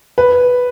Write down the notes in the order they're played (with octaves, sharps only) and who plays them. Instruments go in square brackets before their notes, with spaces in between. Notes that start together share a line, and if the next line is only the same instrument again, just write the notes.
[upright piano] B4